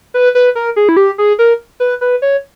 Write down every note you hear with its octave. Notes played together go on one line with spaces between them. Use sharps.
B4
B4
A#4
G#4
E4
G4
G#4
A#4
B4
B4
C#5